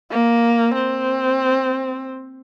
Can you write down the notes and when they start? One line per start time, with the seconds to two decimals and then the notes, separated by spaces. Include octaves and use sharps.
0.11 A#3
0.75 C4